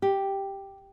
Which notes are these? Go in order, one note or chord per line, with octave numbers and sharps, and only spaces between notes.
G4